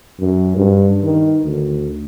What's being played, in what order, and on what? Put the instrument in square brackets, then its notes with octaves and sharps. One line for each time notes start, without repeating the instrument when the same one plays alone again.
[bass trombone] F#2
G2
D#3
D2